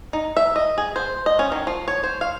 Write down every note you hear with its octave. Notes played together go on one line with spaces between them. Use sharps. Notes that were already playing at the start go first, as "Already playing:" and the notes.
D#4
E5
D#5
G#4
C5
D#5
C#4
D#3
F3
C#5
C5
F5